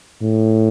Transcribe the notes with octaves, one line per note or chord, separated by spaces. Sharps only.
A2